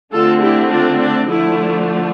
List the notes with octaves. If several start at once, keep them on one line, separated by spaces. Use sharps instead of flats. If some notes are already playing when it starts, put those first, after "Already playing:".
D3 A3 C4 F4 A4
E4 G4
D4 F4
D4
D3 F3 A3 E4